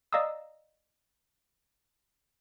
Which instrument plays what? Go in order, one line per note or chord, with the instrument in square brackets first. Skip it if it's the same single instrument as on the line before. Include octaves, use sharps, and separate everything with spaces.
[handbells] D5 D#5 F5 A#5 D#6 E6